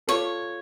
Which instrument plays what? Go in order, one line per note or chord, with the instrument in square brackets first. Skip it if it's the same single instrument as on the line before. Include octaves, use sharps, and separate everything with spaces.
[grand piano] F4 A4 [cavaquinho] C#5